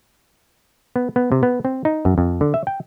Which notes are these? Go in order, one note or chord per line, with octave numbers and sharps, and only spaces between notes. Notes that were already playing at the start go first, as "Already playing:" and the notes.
B3
B3
C3
B3
C4
D#4
F#2
F2
D3
E5
G5